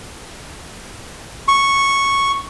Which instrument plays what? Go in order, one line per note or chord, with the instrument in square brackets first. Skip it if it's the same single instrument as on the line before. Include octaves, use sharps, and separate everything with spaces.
[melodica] C#6